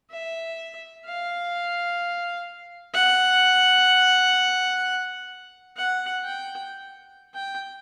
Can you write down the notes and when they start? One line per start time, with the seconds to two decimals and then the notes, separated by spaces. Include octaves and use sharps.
0.11 E5
1.05 F5
2.94 F#5
5.77 F#5
6.24 G5
7.34 G5